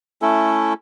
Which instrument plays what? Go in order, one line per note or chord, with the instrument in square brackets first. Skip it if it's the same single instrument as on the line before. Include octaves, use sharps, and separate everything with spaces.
[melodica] A3 C#4 E4 A4